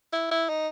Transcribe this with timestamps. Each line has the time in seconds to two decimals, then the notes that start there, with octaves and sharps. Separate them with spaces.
0.13 E4
0.31 E4
0.49 D#4